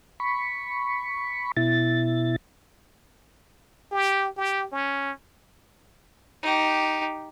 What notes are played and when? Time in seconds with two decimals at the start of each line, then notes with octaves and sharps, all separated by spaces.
0.20 B5 C#6
1.57 B2 E4 A6
3.91 G4
4.37 G4
4.72 C#4
6.43 D#4 G4